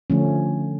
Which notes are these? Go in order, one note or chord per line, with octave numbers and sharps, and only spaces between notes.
D3 F3 A3 C#4